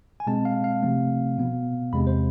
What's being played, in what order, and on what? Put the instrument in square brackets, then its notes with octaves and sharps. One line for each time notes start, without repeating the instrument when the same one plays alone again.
[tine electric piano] G#5
B2 G#3 C4 A5
F5
F5
C3 F3 A3 C4
B2 B3
E2 C3 G#3 C4 B5
C5